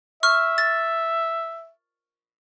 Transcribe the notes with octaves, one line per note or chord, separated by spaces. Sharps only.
E5 C#6 F6
A6